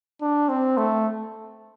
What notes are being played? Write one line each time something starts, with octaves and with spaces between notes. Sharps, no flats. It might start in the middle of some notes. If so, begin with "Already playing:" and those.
D4
C4
A3